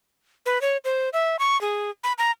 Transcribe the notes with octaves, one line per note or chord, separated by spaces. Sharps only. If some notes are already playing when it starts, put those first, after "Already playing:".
B4
C#5
C5
E5
C#6
G#4
B5
A#5